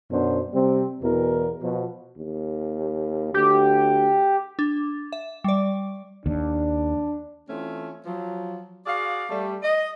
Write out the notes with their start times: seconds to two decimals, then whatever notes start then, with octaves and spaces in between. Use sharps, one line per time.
0.11 F#2 B2 D4 C5
0.53 C3 G3 C4
1.02 E2 B2 E3 A#4
1.62 B2 F3
2.18 D#2
3.34 D2 G4
4.59 D4
5.12 E5
5.44 G3 D5
6.26 D#2 D4
7.49 E3 A3 C4 C#4 F4
8.05 F3 F#3
8.86 F#4 G#4 D5 F5
9.29 G3 A3
9.63 D#5